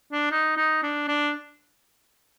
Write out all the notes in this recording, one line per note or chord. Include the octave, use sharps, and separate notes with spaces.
D4
D#4
D#4
D4
D4